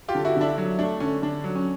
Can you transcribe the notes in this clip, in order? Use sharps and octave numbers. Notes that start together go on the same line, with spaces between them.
F4 G4
D3
E4 F#4
D3 D4 E4
F#3
A3 D4
D3 C#4
D3 D4
F#3
C#4